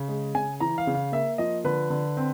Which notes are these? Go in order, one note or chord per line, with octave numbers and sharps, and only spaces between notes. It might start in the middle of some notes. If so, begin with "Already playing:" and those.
Already playing: C#3
G#3
C#3 G#5
E3 A#5
F5
C#3
F5
A#3 E5
F3 D#5
D3 B4
D3
C4